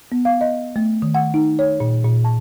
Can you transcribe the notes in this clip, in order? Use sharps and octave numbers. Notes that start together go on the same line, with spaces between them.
B3
F5
D#5
A3
D#3
F#5
D#4
C#5
A#2
A#2
A5